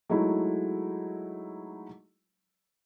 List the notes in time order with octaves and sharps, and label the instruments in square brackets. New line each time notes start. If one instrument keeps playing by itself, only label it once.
[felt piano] F#3 G#3 A3 D#4 E4